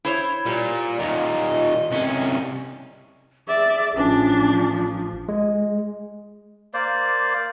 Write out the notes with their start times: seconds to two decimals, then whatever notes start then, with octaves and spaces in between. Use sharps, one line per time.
0.05 E4 C5 C#5
0.46 A#2 G3
0.99 D#2 A#2 D#5
1.91 C2 C#4
3.48 G#4 D5 E5
3.96 A1 F3 C#4 D4
5.29 G#3
6.74 A#3 C5 D5